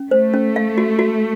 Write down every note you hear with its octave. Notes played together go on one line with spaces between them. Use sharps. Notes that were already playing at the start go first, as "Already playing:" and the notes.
Already playing: C#4
A3 C5
C#4
F5
F#4
F#4